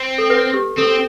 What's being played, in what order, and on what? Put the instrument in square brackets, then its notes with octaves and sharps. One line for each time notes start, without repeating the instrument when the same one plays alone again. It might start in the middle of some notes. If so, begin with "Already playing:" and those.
Already playing: [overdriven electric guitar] C4
[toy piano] A4
B4
G4
[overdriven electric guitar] C4 [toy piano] A4